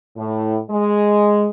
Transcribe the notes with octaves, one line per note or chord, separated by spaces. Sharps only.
A2
G#3